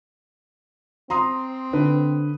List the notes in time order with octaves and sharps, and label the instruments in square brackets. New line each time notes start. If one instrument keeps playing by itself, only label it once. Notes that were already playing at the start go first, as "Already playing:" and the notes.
[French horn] C4 [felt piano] A#5 C6 D#6
[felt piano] D3 B4